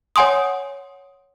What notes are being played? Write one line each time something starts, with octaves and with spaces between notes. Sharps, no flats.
C#5 F#5 G#5 C6 D#6